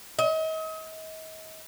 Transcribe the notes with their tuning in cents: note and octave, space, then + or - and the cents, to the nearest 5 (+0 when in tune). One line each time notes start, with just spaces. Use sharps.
D#5 +40